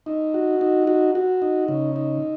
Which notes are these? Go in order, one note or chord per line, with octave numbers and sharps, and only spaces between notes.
D#4
F#4
D#4
F#4
F#4
D#4
C#3
D#4